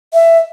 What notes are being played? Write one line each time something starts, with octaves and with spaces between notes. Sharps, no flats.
E5